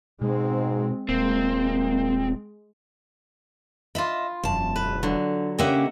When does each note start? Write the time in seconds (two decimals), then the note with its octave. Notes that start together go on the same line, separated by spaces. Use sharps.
0.21 G#2 B2 G#3 C4
1.09 D#1 G#3 A#3 C4
3.95 F4 D#5 E5 B5
4.44 E1 F#2 A5
4.76 B4
5.03 D3 F#3
5.58 C#3 A#3 C#4 G4 D#5 E5 F#5